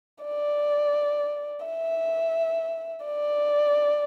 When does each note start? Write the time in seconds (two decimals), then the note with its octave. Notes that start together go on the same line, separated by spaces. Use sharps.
0.24 D5
1.66 E5
3.06 D5